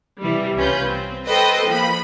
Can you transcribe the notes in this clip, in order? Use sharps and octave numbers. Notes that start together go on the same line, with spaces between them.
C3 E3 G3
C2 C#4 F4 B4 G6
C4
A4 B4 C5 D#5 G5
F3 A#3 B5